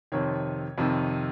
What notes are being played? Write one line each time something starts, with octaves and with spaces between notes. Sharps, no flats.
F2 C3 D#3 C#5
F2 C3 D#3